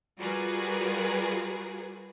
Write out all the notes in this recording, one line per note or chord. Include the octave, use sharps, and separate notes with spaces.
G3 F4 F#4 G#4 A#4 B4